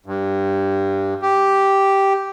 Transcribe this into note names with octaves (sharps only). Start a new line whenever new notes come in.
G2
G4